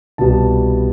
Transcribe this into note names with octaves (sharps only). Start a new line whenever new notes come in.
C2 B2 G3 B3 A5